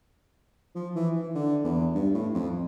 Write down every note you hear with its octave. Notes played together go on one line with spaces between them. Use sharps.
F3
E3
E3
D3
E2
G2
A2
F2